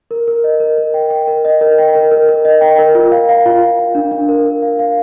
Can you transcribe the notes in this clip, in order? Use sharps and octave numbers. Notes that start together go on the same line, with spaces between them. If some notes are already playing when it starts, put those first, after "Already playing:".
A#4
A#4
D#5
A#4
A#4
G5
G5
A#4
D#5
A#4
G5
A#4
A#4
A#4
D#5
G5
A#4
F4
F5
F5
F4
F4
F4
D4
D4
A#4
A#4
F5
F5